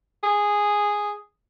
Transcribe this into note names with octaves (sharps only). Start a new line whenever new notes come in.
G#4